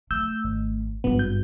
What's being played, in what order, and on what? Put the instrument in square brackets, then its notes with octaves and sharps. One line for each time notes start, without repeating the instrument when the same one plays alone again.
[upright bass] A3 [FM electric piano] E6 G6
[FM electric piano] G#1
[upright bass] G#1 G2 [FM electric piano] B3
[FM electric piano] G6